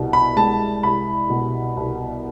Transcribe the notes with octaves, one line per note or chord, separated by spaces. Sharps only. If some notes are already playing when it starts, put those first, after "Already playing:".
Already playing: C2 B2
B5
G#3 A5
C2 B5
B2
C2